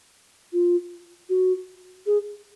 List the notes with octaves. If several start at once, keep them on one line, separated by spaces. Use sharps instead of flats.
F4
F#4
G#4